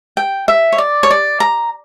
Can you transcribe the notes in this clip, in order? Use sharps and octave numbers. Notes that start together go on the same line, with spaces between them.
G5
E5
C#5
D5
C#5
D5
A#5